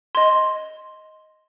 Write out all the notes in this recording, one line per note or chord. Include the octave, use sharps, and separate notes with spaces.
D#5 C6